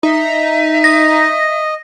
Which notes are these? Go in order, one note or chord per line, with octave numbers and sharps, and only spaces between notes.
D#4 E5
D#5 A#6